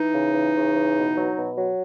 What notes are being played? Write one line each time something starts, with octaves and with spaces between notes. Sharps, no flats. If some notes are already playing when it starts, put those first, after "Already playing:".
Already playing: E3 D#4
C#3
E3
C#3
E3
B2
F#3
B2
F#3